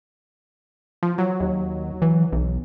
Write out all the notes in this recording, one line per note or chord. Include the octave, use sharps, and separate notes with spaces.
F3
F#3
D#2
E3
B1